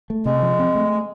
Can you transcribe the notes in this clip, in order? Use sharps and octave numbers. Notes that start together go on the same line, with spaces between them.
A3
C3 G#3
F3
C4
A3